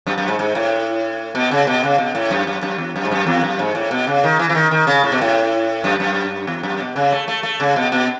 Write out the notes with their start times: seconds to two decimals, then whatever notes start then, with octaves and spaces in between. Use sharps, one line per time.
0.07 F#2
0.18 F#2
0.28 G#2
0.39 G#2
0.55 A2
1.35 B2
1.51 C#3
1.67 B2
1.83 C#3
1.98 B2
2.15 A2
2.31 F#2
2.47 F#2
2.63 F#2
2.78 E2
2.96 F#2
3.05 G#2
3.11 F#2
3.27 E2
3.44 F#2
3.59 G#2
3.75 A2
3.91 B2
4.07 C#3
4.24 D#3
4.39 E3
4.49 E3
4.55 D#3
4.71 D#3
4.87 C#3
5.04 A2
5.12 B2
5.21 A2
5.84 F#2
6.00 F#2
6.47 E2
6.63 F#2
6.80 B2
6.96 C#3
7.12 A3
7.28 A3
7.43 A3
7.60 C#3
7.76 B2
7.92 B2